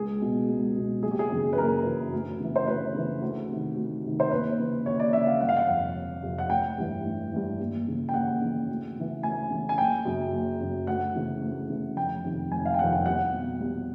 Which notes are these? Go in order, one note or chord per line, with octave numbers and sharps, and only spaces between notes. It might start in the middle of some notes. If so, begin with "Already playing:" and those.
Already playing: C#2 G#4
B2
C#2
B2
F#1 G#4
G4
G#4
F#2 C#3 E3
B4
F#1 A#4
F#2 C#3 E3
D2
C#3 E3
C5
D2 B4
C#3 E3
D2
C3 D#3
D2
C3 D#3
C5
D#2 B4
C#3 E3
D#2 C#5
D5
C#3 E3 E5
F5
G1 F#5
F5
F#5
F2 C3
G1
F2 C3
F#5
A1 G5
G2 E3
A1
G2 E3
D#2
C#3 E3
G5
D#2 F#5
C#3 E3
D2
C#3 E3
D2 G#5
C#3 E3
G#5
F#1 G5
F#2 C#3
F#1
F#2 C#3
D2 F#5
C#3 E3
D2
C#3 E3
F1 G5
F2 C3 D#3
F1 G#5
F5
G5
F2 C3 D#3 F#5
G5
C2 F#5
B2
C2